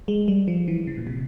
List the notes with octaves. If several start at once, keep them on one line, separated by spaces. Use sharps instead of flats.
G#3
G3
F3
E3
C#3
A#2
C3